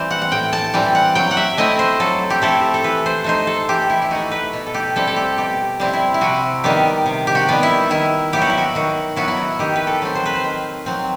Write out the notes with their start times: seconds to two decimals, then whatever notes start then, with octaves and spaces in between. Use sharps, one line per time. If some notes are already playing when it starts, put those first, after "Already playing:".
Already playing: E3 G3 C4 C5
0.11 F#5
0.22 F#5
0.31 A2 G5
0.53 A5
0.74 E3 G3 C4 G5
0.95 F#5
1.15 F#3 G5
1.31 F#5
1.37 E5
1.57 A3 C4 E4 D#5
1.79 C5
2.00 F#3 A4
2.30 G4
2.42 A3 C4 E4 A4
2.74 A4
2.84 E3 B4
3.06 C5
3.24 A3 D#4 C5
3.47 A4
3.69 E3 G4
3.90 E4
4.02 E4
4.11 A3 D#4 F#4
4.31 B4
4.53 B2
4.66 A4
4.74 G4
4.96 G3 C4 E4 A4
5.07 A4
5.16 G4
5.38 B2 G4
5.80 G3 C4 E4
5.93 E4
6.14 E4
6.21 C3 F#4
6.64 D#3 G3 B3 G4
7.06 C3
7.27 G4
7.35 F#4
7.49 D#3 G3 B3
7.63 E4
7.90 D#3 E4
8.33 F#3 B3 E4 G4
8.42 F#4
8.50 E4
8.58 F#4
8.75 D#3 F#4
9.16 F#3 B3 E4 F#4
9.28 E4
9.37 F#4
9.59 D#3 G4
9.76 B4
9.87 A4
10.02 F#3 C4
10.15 C5
10.26 B4
10.35 C5
10.44 D#3
10.86 F#3 C4